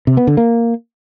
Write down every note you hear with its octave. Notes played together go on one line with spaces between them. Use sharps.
C3
B3
D3
A#3